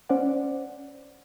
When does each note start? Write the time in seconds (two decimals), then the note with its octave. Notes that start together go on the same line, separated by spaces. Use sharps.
0.09 C#4 C5 D5 F#5